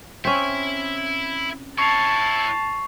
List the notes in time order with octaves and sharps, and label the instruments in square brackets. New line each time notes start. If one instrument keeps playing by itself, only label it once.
[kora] C4 C#4 [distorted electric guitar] E4 E5
[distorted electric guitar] E4 C#5 [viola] A5 [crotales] C#6 C7 F7